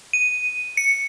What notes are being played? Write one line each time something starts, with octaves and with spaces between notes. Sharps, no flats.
D#7
C#7